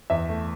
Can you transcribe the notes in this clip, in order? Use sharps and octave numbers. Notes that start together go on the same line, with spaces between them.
E2 E5
A3